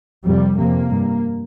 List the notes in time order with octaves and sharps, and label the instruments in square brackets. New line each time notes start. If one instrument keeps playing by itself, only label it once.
[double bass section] F2 C3 G3
F2 C3 A#3
G2